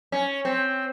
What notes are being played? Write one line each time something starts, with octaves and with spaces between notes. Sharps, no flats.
C#4
C4